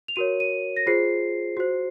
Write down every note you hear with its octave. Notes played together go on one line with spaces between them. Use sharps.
F7
F#4 A#4 C#5 D#7
D#7
A#6
F4 G#4 C5 C7
F#4 C5